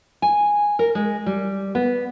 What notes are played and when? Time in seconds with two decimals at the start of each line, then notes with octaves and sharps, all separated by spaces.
0.22 G#5
0.79 A#4
0.95 G#3
1.26 G3
1.75 B3